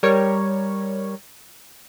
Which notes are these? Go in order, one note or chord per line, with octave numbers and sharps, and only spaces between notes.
G3 A#4 C#5